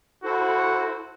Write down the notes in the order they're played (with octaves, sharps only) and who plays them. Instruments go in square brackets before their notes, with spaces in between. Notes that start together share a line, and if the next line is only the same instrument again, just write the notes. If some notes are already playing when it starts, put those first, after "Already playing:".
[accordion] E4 A4 C5 [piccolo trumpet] F#4